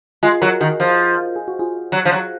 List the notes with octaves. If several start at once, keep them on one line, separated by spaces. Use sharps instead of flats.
G#3 F4 G#4
F#3 F#4 A#4
D#3 F#4 A#4
F3
G#4
F#4
F4 G#4
F#3
F3
F#3